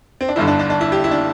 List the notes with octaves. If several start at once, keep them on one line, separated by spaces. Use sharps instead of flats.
C4
D4
G1 G2 D3 E4
D4
D4
D4
E4
G4
E4
D4